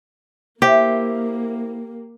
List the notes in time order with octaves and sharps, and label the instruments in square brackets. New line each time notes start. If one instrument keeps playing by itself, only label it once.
[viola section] A#3 [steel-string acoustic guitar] E4 C5 E5 [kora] G4